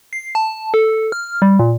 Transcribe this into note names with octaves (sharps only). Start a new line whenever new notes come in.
C7
A5
A4
F6
G3
A#2